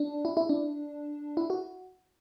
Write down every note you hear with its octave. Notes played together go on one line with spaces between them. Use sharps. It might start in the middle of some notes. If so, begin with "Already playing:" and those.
Already playing: D4
E4
E4
D4
E4
F#4